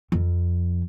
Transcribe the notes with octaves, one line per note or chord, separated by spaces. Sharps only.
F2